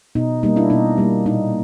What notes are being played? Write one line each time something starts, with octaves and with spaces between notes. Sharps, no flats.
B2 D#4
G3 A#3 D#4
D4 E4
B2 D#4
G3 A#3
A#2 D#4